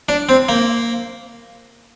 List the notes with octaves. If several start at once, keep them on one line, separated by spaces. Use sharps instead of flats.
D4
C4
A#3